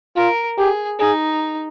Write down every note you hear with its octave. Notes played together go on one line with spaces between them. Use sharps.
F4 A#4
G4 G#4
D#4 G#4